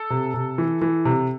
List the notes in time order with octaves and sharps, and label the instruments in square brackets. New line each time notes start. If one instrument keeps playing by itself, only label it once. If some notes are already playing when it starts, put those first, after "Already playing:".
Already playing: [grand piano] A4
C3
C3
E3
E3
C3